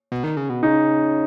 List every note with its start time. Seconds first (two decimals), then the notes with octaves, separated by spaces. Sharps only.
0.12 B2
0.24 D#3
0.37 C#3
0.50 B2
0.63 C#3 D#4